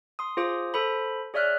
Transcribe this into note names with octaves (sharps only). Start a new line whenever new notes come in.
C6 D#6
F4 G#4 C5 D6 D#6
A4 C5 B5
G#4 C#5 D5 E5 F6 F#6